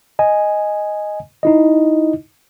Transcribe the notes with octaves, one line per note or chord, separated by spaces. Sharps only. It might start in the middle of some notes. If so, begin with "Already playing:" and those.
D#5 G#5
D#4 E4 D#5